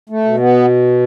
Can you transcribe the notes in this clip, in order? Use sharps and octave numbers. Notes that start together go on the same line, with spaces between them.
A3
B2
B3